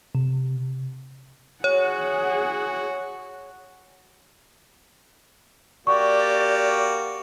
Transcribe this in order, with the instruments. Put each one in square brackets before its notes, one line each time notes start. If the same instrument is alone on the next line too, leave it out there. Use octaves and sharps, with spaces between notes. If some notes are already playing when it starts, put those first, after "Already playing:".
[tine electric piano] C3
[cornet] F#4 [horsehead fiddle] G#4 F#5 [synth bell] C#5
[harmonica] A#3 F#4 G4 [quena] D5 [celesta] C#6